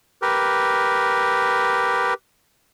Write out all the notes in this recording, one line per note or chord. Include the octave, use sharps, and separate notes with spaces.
G4 A#4 B4